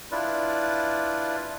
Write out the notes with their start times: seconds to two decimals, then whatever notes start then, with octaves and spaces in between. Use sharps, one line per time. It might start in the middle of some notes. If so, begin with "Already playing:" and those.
0.12 D4 E4 F4 B4 D5